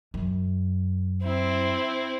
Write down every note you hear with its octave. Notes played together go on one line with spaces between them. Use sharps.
F#2
C4 E4